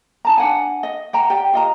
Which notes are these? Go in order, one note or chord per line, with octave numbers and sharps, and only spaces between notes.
D#4 A5 A#5
D4 F#5 G#5
D#5
F#5 G5 A#5
G4 D5 G5
F4 D#5 A#5